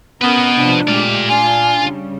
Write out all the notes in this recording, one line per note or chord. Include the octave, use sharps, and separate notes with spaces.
B3 C#4 A#4 B4 D#5
C3 F3 D4
A#2 G#3 A3 G4 D5 F5
D4 F4 G#5
C#3 G3